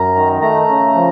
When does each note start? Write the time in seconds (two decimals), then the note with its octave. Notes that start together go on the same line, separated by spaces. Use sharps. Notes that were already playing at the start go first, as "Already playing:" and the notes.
Already playing: F#2 A#5
0.15 D#3
0.42 A3 A#5
0.68 C#3
0.95 F3